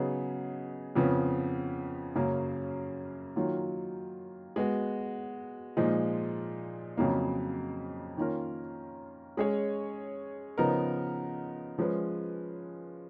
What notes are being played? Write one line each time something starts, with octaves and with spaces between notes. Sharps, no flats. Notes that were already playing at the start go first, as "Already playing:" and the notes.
Already playing: C#3 F#3 B3 D#4 G#4
F2 C#3 F3 B3
F#2 C#3 F#3 A#3 C#4
D#3 F#3 A#3 F4
G#3 B3 F#4
A#2 F3 G#3 D#4
F2 C#3 F#3 A#3 D#4
D#3 A#3 C#4 F4 A#4
G#3 C#4 G#4 C#5
C#3 F3 B3 D#4 A#4
F3 G#3 C#4 G#4 B4